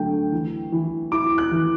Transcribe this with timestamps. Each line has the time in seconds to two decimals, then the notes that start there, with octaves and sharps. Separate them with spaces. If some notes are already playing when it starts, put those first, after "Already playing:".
Already playing: D3 F#3 A3 G5
0.32 E3
0.72 E3
1.12 E4 D6
1.38 F#6
1.51 E3